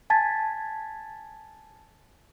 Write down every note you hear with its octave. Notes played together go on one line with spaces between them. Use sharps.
G#5 A5 G#6 A6 B6